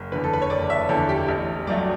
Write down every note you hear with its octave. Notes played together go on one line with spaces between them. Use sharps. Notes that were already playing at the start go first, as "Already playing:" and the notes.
Already playing: F#1
E2 D3 B4
A4
B4
C#5
F#1 D5
E5
E2 D3 A4
G4
A1
G2 F#3 A3 D5